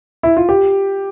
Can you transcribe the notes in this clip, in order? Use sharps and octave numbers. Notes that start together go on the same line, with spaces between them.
E4
F4
G4